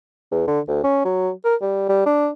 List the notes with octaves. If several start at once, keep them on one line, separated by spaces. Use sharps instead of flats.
E2
D3
D2
C#4
F#3
A#4
G3
G3
D4